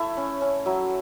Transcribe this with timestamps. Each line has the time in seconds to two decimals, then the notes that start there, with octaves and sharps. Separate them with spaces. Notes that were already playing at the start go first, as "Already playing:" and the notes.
Already playing: A3 E4 E5
0.17 C#4
0.41 C#4
0.66 F#3 E5